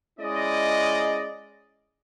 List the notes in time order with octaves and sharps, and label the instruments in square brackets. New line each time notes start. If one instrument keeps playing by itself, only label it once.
[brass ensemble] G#3 C#4 E4 D5 D#5